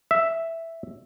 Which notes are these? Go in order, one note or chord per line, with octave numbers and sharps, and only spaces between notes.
E5